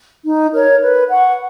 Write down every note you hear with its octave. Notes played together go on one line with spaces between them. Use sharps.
D#4
A#4 C#5
B4
F#5 C#6